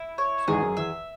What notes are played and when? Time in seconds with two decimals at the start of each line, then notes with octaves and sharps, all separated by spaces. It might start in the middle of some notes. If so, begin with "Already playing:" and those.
Already playing: E4
0.18 C#5
0.48 E2 G#2 G#4
0.62 F#2
0.77 E2 E5